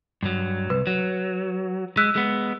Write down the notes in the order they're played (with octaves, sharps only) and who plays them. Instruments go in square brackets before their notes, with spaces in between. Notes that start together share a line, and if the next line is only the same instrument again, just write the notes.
[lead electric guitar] G2 F#3
[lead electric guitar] C2 [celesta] B4
[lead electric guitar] F#3
[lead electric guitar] G#3 [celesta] E6 F#6 B6
[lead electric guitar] G#3 B3